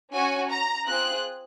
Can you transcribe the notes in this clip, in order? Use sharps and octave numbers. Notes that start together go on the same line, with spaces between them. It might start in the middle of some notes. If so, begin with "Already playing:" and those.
C#4 F#4 G#5
A#5
C4 F4 G#4 F#6